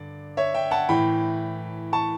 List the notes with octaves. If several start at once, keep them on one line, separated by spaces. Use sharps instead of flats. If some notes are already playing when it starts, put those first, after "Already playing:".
Already playing: G2 D3 D5
C#5 E5
E5 G5
F#5 A5
A2 E3 G5 B5
A5 C#6